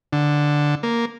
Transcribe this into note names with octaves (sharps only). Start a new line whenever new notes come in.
D3
A#3